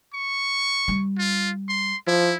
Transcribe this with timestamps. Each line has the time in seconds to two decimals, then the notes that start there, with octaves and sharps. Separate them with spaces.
0.14 C#6
0.88 G3
1.18 F4
1.69 C6
2.07 F3 E4